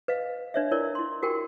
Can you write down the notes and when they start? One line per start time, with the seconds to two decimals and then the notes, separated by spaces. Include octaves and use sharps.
0.08 B4 D#5 F5
0.54 D4 B4 C#5 D#5 E5
0.71 E4 A#4 C#5 D5
0.95 E4 C6
1.22 F#4 G4 A#4 G5 G#5